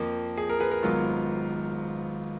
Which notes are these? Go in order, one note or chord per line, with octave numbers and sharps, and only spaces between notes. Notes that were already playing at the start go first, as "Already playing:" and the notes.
Already playing: F2 F3 A#3
G#4
A#4
G#4 B4
A#4
G#1 G#2 F#3 B3 F4